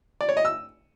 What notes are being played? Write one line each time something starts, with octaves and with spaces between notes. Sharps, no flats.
D5
C#5
D#5
E6